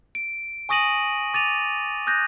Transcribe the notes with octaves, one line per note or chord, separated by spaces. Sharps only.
D7
G#5 C#6 D#6 A#6 D#7 F#7
D6 A6 D#7 F7
D#6 F#6 G6 A#6